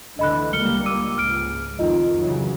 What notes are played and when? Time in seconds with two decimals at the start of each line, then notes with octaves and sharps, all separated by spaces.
0.19 D2 D3 E3 D#5 B5 F#6
0.53 C#2 G3 A#3 F6 C#7 G7
0.86 D6 E6 D#7
1.18 C#2 G#2 F6 D7
1.79 F2 D#3 F4 D#5
2.20 C#3 E3 F#3